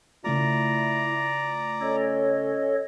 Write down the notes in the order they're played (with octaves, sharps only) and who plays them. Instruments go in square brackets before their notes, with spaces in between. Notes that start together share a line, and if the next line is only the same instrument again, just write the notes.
[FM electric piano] C#3 A3 F4 [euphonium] E4 [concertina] D5 A#5
[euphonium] C#4 [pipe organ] A4 C#5 D#5